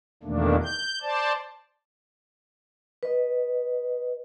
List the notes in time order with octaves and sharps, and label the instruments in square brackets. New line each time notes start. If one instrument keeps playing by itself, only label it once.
[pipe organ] E2 B2 D#3 A3 A#3 D4
G6
C5 D5 A5
[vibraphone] B4 D#5